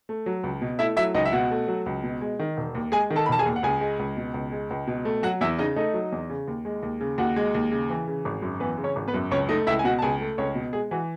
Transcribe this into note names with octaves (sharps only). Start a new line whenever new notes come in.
A3
F#3
C#2
B2
A3 E4 E5
F#3 E4 E5
C#2 D#4 D#5
E5
B2 F#4 F#5
A3
F#3
C#2
B2
G#3
D#3
E1
D#2
G#3 G#4 G#5
D#3
A4 A5
B5
E1 A5
G#4 G#5
D#2
F#5
C#2 G#4 G#5
G#3
C#2
B2
C#2
G#3
C#2
B2
A3
F#3 F#4 F#5
E2 E4 E5
C#3 D#4 D#5
A3 D#4 D#5
F#3
E2
C#3
D#2
G#3
D#2
C#3
D#2 F#4 F#5
G#3
D#2
C#3
E3
C#3
G#1
F#2
E3 B3 B4
C#3
C#4 C#5
G#1
B3 B4
F#2
C#2 C#4 C#5
A3 D#4 D#5
C#2 E4 E5
G#5
B2 F#4 F#5
A5
C#2 G#4 G#5
A3
C#2 C#4 C#5
B2
G#3 G#4
E3 F#4